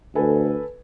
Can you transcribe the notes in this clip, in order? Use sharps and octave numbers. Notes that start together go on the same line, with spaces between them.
D2 A4 B4 G#5